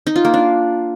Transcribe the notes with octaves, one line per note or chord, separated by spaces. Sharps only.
D#4
F4
A#3
D4